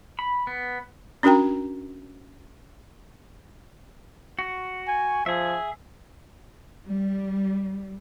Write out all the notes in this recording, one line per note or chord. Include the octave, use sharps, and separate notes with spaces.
B5
B3
C#4 D4 F#4 A#4 G5 A#5
F#4
G#5
F3 G#4 E5
G3